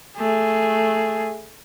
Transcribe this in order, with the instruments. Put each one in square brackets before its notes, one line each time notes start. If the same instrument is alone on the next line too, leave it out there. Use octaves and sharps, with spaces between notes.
[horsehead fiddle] A3 G#4